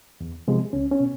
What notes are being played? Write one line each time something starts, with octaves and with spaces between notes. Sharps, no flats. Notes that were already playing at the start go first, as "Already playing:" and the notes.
E2
C3 F3 G#3
C#2 C#4
C#4
B2